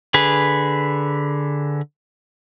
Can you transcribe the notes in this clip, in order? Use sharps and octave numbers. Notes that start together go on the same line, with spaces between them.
D3 G#4 B4